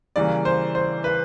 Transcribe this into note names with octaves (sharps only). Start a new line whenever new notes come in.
C#3 E3 G3 A#3 D5
C5
C5
B4